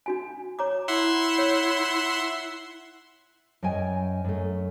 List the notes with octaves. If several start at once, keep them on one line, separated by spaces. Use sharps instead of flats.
D4 F#4 G#5
C#5 A#5 D6
E4 E5 F#5 C6
C#5
F#2 D#5 G5 G#5
F#2 A3